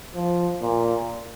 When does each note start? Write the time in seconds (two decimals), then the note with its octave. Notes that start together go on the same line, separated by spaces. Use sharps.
0.15 F3
0.62 A#2